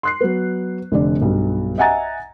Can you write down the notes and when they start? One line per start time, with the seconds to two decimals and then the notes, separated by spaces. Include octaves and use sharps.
0.03 C6 F#6 C7
0.21 F#3 B3
0.92 F1 D3 D5
1.21 B1 G2
1.78 D#5 E5 F#5 G#5 A#5 A6